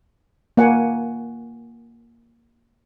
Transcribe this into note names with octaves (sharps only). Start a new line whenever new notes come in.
A#3 F#5 G#5